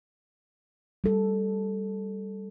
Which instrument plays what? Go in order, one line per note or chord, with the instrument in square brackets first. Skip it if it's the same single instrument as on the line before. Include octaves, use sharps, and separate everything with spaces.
[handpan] G3 A4